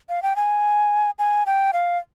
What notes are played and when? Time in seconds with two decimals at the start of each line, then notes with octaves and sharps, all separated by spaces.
0.09 F5
0.23 G5
0.36 G#5
1.19 G#5
1.46 G5
1.73 F5